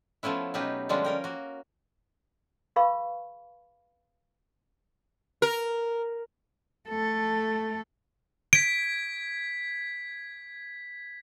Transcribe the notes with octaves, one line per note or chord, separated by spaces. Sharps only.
F3 A3 B3 C#4 E4
B2 F#3 C#4 D#4 G4 B4
D3 F3 G3 G#3 C#4 D4
C#4 A#4 G5
A#3 F#4
G#4 B4 F5 B5 C#6
A#4
A3 A4
G#6 B6 D7